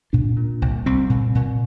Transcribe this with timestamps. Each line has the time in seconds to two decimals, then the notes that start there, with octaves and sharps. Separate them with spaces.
0.13 A#2 D4
0.37 A#2
0.62 C2
0.86 C2 C4
1.10 A#2
1.35 A#2